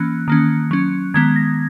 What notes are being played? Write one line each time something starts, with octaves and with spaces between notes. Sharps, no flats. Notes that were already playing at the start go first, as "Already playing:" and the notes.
Already playing: E3 A#3 C#4 F#6
D#3 A#3 C#4
F#3 C#4
D#3 G#3 B3 G#6
A#6